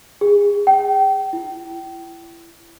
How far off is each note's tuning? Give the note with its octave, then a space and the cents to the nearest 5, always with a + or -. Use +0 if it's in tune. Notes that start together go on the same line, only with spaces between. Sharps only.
G#4 -30
G5 -30
E4 +30